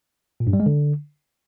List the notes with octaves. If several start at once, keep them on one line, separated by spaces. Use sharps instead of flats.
A#2
G2
G3
G#3
D3